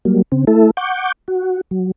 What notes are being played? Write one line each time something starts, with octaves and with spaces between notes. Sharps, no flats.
F#3 G3 A#3
C#3 C4
A3 E4 A4
F#5 C#6 D6 G6
F#4
F#3